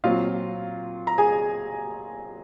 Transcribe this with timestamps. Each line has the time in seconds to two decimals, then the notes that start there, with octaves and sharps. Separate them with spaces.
0.04 A#2 F#3 C4 F4 F5
1.07 A#5
1.18 G#4 G#5